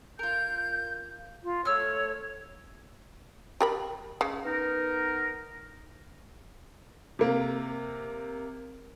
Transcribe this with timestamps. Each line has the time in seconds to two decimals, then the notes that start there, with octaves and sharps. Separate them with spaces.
0.19 F4 A#4 G6
1.44 F4
1.65 A3 C#5 E6 F6
3.61 G4 A#4 B5
4.21 C#3
4.44 B3 D#4 A#4
7.19 C3 A#3